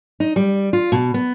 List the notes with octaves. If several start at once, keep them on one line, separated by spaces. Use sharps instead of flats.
D#4
G3
F4
B2
B3